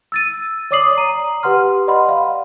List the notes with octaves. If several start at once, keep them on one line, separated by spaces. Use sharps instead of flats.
E6 A6 D#7
C#5 D5 D6 D#6 C7 F#7
A#5 D#7
G4 B4 F#5 C6 F6
D5 D#5 F#5 B5 C6
F5